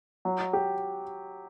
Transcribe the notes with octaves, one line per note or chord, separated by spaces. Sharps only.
F#3
G4